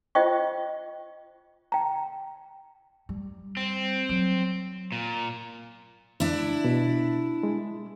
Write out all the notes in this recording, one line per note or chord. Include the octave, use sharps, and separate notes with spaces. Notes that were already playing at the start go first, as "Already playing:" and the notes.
F4 C5 D#5 G5 C#6
G5 A#5
G3
C4
F#3
A#2
D4 E4
B2
G#3